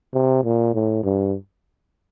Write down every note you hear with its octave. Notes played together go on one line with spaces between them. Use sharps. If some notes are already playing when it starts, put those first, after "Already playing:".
C3
A#2
A2
G2